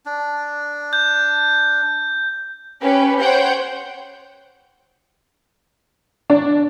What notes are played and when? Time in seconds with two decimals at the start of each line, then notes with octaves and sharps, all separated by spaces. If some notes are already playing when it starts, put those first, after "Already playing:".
0.06 D4
0.93 G6
2.82 C#4 G4 B4
3.20 C5 C#5 F#5 G5 G6
6.30 D4